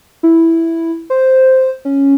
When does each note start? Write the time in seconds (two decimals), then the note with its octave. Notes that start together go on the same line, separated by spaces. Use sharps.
0.23 E4
1.10 C5
1.85 C#4